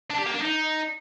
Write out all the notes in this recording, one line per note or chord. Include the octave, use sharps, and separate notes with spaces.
D4
G4
A#3
D4
D#4